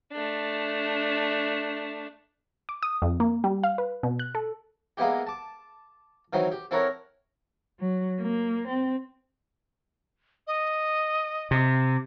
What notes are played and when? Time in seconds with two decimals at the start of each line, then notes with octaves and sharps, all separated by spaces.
0.12 A3 D4
2.69 D6
2.83 D#6
3.02 F2
3.20 A#3
3.44 G3
3.64 F5
3.78 B4
4.03 B2
4.19 F#6
4.35 A4
4.97 G#3 A#3 B3 E4 G4
5.27 A5 D6
6.33 D#3 E3 F#3 C4
6.51 G4
6.71 C4 E4 A4 A#4 C#5 F#5
7.80 F#3
8.22 A#3
8.68 C4
10.47 D#5
11.51 C3